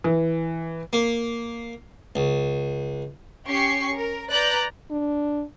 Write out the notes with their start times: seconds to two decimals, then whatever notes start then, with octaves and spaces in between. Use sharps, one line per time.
0.04 E3
0.93 A#3
2.16 C#2
3.46 C#4 G4 C#6 C7
3.95 A#4
4.31 B4 D5 A#5 F#6 G6 A6
4.90 D4